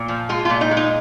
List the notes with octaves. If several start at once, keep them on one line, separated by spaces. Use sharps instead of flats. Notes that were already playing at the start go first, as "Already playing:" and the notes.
Already playing: A#2
F3
G#3 F4
A#2 F4
D#4
G#3
D#4